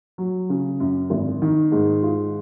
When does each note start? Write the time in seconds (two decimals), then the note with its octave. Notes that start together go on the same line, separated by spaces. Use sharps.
0.18 F#3
0.49 C#3
0.80 F#2
1.10 G#1
1.42 D#3
1.72 G#2
2.03 F4